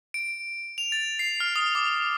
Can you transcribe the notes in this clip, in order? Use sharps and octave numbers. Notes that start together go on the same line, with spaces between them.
D7
F7
A6
C7
F6
D#6
D6